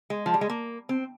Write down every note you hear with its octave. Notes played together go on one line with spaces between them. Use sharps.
G#3
F3
G3
G#3
A#3
C4